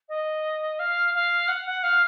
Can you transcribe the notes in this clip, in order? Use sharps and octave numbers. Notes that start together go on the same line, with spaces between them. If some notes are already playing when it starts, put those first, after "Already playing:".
D#5
F5
F5
F#5
F#5
F5